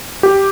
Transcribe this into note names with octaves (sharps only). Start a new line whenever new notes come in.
G4